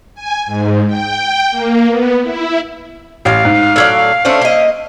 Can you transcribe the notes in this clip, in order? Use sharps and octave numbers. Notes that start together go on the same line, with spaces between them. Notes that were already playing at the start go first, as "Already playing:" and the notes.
G#5
G#2
G5
A#3
B3
E4
A1 F5
G#2
A2 F#3 D5 E6 F6 G#6
A3 C#4 D4 C5 E5
A#3 D#5